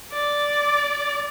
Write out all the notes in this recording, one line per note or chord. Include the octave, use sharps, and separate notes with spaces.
D5